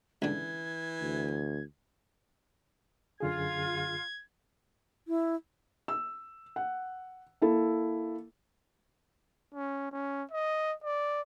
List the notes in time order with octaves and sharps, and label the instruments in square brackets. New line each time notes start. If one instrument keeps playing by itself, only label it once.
[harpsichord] C#2 D3 [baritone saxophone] E3 [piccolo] G#6
[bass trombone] D2
[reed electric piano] F#2 D3 G#4 [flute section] F4 [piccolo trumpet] G#6
[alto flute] E4
[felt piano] E6
F#5
A#3 E4 A4
[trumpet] C#4
C#4
D#5
D5